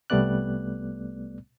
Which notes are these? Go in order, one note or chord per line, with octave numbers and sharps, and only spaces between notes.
C2 G3 A3 B3 D5 F#6